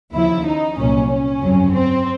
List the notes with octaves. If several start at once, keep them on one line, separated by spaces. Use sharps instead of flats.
D#2 C#3 F3 E4
D#4
C2 A#2 F#3 C#4
C#4
G1 F2 C#3 F#3
C4